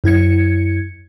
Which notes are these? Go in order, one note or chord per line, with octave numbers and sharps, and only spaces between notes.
F#2 E4 G#6 C#7